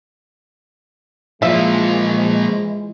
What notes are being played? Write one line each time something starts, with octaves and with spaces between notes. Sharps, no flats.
A#2 E3 F3 G#3 F4 E5